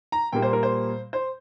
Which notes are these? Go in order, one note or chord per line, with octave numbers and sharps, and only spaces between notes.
A#5
A#2 G3 A#3 G5
C5
A#4
C5
C5